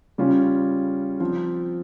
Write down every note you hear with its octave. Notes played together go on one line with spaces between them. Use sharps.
C#3 G3 C#4 F4
F3 C4 F4